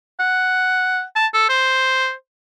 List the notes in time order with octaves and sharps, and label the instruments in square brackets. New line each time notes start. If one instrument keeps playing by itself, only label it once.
[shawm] F#5
A5
A4
C5